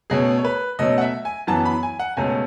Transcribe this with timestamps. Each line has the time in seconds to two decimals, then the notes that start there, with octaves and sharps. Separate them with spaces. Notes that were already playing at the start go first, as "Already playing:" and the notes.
0.10 B2 A3 C#4 G#4
0.37 C#5
0.45 B4
0.79 B2 F#3 A3 C#4 D#5
0.98 F#5
1.01 E5
1.25 G#5
1.47 F#2 E3 B3 A5
1.65 B5
1.83 G#5
1.99 F#5
2.17 C#2 B2 A3 C#4 G#5